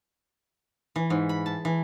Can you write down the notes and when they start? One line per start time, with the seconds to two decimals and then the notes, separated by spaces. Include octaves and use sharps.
0.96 E3
1.10 G#2
1.29 B5
1.46 A5
1.65 E3